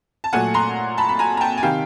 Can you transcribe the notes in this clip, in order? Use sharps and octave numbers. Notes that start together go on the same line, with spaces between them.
A5
A#2 F#3 A3 F#5 G#5
A#5 C6
A5 B5
B5
G#5 A#5
A#5
G5 A5
G#5
C3 D#3 F5 G5